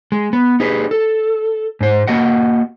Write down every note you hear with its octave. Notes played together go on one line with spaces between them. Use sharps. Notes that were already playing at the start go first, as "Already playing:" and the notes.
G#3
B3
D#4 G#4 B4
A4
G#2 C5
A#3 F#4 D#5 F#5